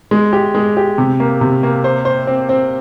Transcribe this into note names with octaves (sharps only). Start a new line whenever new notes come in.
G#3
G4
G#3
G4
C3
A#3
C3
A#3
C5
C5
C4
C4